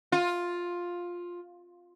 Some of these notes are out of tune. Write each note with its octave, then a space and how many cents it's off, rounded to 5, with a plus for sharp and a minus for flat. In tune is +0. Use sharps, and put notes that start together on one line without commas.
F4 +10